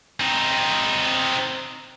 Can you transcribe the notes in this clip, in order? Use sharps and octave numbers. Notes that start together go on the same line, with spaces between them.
C4 D#4